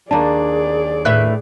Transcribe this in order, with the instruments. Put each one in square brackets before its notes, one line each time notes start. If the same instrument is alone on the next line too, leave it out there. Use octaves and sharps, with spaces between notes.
[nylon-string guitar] D#2 D4 [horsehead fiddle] G#4 D5 [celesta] A5 A#5
[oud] A2 B4 E5 [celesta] F#6